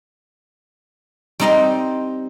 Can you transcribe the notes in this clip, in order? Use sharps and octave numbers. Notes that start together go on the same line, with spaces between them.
G3 C4 D#4 D#5 G5 C6